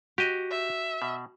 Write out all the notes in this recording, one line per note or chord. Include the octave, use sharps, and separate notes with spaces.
F#4 G4 D#5
E5
B2